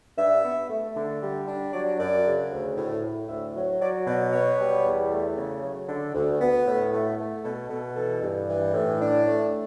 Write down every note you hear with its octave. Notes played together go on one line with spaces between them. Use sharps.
G2 E5
B3
A3
D3
G3
D4
F#3 D5
F#2 D5
C#3
D2
A2
A2
D2 E5
F#3
F#3 D5
B2 D5
B3 C#5
G3
E2
A3
C#3
F#3
D3
D2
B3
A2
A3
A3
B2 A4
B2 A4
E3 A4
G2
E3
A2
D4
A3